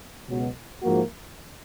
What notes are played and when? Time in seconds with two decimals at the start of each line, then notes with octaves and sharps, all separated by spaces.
0.28 C#2 B2 F#3
0.82 G#2 F3 A#3 F#4